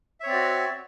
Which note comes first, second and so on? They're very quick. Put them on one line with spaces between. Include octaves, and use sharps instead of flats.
E5 C#5 C4 D5 F#4